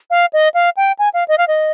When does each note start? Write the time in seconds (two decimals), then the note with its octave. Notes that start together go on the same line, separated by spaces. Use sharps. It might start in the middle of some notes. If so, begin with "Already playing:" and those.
0.10 F5
0.33 D#5
0.54 F5
0.77 G5
0.99 G#5
1.14 F5
1.28 D#5
1.38 F5
1.48 D#5